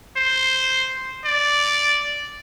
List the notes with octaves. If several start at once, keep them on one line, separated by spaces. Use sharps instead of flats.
C5
D5